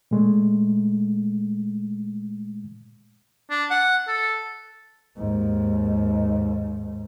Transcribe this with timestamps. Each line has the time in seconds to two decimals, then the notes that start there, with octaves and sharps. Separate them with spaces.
0.11 A#2 G#3 A3
3.50 D4
3.71 F#5
4.07 A4
5.17 D#2 G#2